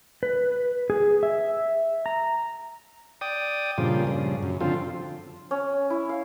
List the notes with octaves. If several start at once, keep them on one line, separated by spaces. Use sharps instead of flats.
B4
G#4
E5
A#5
D5 G5 D#6
G2 A#2 C#3 F3
G2 C#3
F#2
D3 F3 C4 F4
C#4
E4
F5